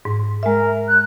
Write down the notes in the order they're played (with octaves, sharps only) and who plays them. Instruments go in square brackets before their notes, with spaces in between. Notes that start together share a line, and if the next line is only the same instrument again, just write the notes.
[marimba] G#2
[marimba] G#3 E5 [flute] A#4
[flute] F#6